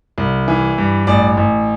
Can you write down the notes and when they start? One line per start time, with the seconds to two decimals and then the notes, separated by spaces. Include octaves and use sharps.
0.18 C2
0.48 E3
0.78 G2
1.07 A1 D5
1.37 A1